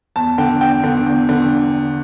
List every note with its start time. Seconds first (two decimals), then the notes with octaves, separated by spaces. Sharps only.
0.16 E2 A5
0.38 D3 G5
0.61 E2 G5
0.84 D3
1.06 E2
1.29 D3